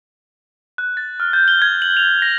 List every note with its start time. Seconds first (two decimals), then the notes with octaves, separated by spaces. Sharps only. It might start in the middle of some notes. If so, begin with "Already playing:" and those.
0.78 F#6
0.97 A6
1.20 F6
1.33 G6
1.48 G7
1.62 G#6
1.82 F#7
1.97 F7
2.22 A#6